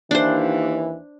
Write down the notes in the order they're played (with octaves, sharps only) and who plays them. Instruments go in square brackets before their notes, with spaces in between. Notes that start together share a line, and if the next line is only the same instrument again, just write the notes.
[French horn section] D#2 E3 [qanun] D4 C5